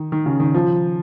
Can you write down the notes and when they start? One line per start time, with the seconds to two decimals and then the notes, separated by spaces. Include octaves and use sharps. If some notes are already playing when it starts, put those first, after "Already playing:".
Already playing: D#3
0.12 D#3
0.26 C#3
0.40 D#3
0.54 F3